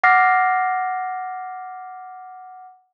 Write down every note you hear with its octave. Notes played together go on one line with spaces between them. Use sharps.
F#5 D6 F6 A6 A#6 C7